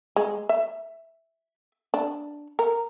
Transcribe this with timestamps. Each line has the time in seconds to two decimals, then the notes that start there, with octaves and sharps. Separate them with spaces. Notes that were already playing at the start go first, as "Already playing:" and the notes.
0.16 G#3
0.49 E5
1.94 D4
2.59 A#4